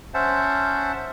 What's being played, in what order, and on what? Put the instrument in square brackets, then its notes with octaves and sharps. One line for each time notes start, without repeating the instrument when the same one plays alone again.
[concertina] C#4 C5 E5 F#5 A5